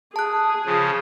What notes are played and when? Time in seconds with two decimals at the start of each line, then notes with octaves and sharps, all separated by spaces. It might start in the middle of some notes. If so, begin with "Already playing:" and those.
0.16 G#4 A5 F#6
0.65 C#3 F3